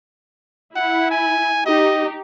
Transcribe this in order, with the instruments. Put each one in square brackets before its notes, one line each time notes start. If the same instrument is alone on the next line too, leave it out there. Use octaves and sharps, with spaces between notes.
[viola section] E4 [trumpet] F#5
[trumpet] G#5
[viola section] D#4 G4 [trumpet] D#5